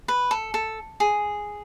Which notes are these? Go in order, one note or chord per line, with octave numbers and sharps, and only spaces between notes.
B4
A4
A4
G#4